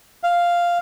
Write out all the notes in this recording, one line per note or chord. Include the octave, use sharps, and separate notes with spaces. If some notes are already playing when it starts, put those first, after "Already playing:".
F5